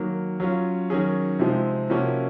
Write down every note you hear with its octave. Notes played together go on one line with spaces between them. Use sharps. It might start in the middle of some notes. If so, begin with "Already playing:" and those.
Already playing: D#3 F#3 A#3
F#3 C#4 F4
D#3 F#3 C#4 G#4
C3 F3 G#3 C4 D#4
C3 F3 A#3 C#4 F#4